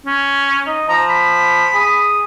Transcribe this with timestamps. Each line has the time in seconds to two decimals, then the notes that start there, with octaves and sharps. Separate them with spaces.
0.06 C#4
0.67 D#4
0.89 F3 A#5
1.09 B5
1.74 G#4